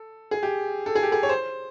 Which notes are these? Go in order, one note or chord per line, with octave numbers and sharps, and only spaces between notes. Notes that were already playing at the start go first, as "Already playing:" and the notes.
Already playing: A4
G#4
G4
A4
G#4
G4
G#4
C#5
C5